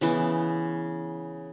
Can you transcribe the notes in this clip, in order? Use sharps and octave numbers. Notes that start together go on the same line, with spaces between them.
C#3 E3 B3